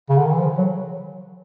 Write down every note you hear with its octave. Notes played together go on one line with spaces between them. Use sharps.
C#3
D3
D#3
E3
F3
F#3